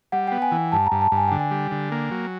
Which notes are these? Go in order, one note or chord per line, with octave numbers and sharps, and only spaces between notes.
G3 F#5
B3 G5
G#5
E3
G2 A5
A#5
G2
A5
G2
G#5
D3 G5
G#5
G3
D3
A#3
F#3